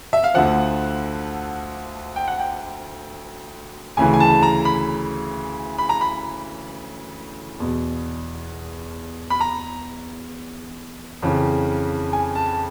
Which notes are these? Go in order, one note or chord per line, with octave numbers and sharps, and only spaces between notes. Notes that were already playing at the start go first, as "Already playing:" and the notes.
E5
F5
D2 D3 F3 F#5
G5
F#5
G5
D2 C#3 E3 G#5
G#5
A5
A#5
B5
B5
A#5
B5
E2 B2
B5
A#5
F2 C#3 E3
G#5
A5